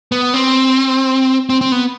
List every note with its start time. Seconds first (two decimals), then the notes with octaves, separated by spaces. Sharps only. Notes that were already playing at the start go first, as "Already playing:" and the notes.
0.12 B3
0.34 C4
1.49 C4
1.61 C4
1.72 B3